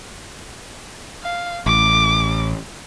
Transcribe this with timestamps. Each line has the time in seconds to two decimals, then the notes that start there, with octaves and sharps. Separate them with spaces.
1.23 F5
1.66 A1 D6